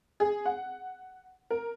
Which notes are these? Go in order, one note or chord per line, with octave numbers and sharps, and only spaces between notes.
G#4
F#5
A#4